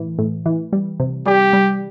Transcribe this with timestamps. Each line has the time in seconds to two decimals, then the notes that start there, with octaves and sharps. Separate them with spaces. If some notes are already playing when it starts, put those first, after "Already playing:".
Already playing: A2 E3
0.19 A2
0.46 E3
0.73 G3
1.00 C3
1.26 G3 G4
1.53 G3